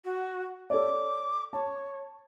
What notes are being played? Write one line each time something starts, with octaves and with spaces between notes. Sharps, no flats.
F#4
A4 C#5 D5 D6
C#5 A5